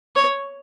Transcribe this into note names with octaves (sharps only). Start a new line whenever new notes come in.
C#5